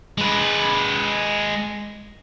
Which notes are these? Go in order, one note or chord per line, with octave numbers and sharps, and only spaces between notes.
G#3 B4